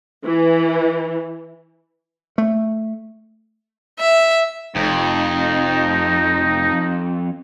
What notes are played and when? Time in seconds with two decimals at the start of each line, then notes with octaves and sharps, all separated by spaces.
0.25 E3
2.38 A3
3.99 E5
4.76 F1 F2 D#4